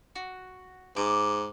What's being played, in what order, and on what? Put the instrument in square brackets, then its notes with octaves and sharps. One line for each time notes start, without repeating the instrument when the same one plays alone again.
[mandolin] F#4
[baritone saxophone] G#2 [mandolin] D6